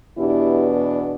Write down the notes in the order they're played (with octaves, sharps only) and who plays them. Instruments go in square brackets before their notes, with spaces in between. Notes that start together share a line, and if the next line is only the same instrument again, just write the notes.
[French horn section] E2 B2 B3 D4 E4 G4